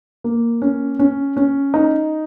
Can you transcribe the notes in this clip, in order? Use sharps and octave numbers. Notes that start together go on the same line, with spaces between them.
A#3
C#4
C#4
C#4
D#4